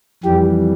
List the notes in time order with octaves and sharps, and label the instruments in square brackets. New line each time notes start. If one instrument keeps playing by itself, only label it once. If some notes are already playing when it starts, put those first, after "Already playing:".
[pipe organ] F2 E3 G3 G4